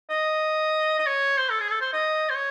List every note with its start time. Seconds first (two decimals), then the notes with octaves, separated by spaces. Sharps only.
0.10 D#5
0.99 D#5
1.06 C#5
1.38 C5
1.50 A4
1.60 G#4
1.71 A4
1.81 C5
1.93 D#5
2.30 C5
2.35 C#5